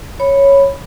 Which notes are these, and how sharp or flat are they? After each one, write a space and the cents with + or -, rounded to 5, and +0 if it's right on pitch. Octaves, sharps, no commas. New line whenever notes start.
C#5 -5 B5 +0